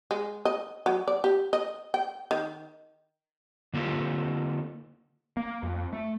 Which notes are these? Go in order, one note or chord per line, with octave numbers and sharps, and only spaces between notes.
G#3
D#5
F#3
D5
G4
D#5
G5
D#3
D3 A#3 F4 G4 A4
A#3
F2
A3